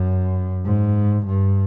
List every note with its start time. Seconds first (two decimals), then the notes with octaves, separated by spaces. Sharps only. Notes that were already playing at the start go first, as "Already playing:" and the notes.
Already playing: F#2
0.65 G#2
1.26 G2